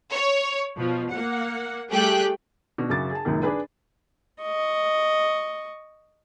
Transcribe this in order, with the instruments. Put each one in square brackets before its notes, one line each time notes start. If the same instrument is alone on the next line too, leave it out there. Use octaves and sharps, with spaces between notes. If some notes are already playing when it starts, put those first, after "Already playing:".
[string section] C#5
B2 F3
A#3 F#5
G3 A3 G4 G#4 G5 F#6
[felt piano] B2 D4 F#4
F#2 C#3 F#4 D6 A6
G#4 A5
C#2 F#2 A#2 D#3
D4 G#4 B4
[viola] D#5 C#6